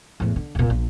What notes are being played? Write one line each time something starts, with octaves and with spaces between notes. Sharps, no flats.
E2 A2
D3
D#1 A#2
A#1